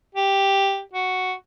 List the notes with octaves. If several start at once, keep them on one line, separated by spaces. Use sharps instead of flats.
G4
F#4